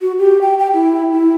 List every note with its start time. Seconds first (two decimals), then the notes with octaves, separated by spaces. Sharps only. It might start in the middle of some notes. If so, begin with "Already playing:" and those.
0.01 F#4
0.19 G4
0.41 G5
0.59 G5
0.74 E4
1.12 E4